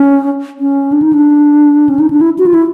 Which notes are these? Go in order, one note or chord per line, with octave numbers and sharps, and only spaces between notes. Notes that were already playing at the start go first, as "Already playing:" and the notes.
Already playing: C#4
C#4
D4
D#4
D4
C#4
D#4
D4
E4
F#4
F4
E4